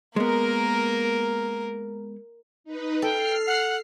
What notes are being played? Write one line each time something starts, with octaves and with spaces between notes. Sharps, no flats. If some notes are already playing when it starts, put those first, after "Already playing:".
G#3 A#3 B3 A#4
D#4 B4
A4 G5 F6 C7
F#5